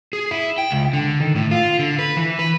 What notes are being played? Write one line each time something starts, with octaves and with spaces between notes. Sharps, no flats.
G#4
E4
G5
C#2
D3
D#3
A2
F4
D3
B4
E3
B4